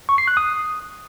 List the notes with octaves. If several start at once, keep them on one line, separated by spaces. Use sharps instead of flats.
C#6
C7
F#6
D#6